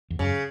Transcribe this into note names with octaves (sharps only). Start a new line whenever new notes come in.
E2
F#2 C#3